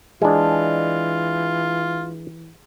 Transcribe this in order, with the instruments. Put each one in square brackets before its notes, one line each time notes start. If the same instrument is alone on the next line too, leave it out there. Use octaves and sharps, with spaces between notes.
[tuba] E3 [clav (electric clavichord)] G#3 D4 [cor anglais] F4 [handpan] G#4